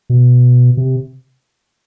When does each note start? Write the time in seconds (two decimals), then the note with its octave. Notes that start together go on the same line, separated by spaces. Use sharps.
0.10 B2
0.77 C3